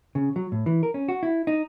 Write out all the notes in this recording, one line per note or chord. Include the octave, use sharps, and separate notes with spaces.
C#3
F#3
A2
E3
A#4
C#4
F#4
E4
D#4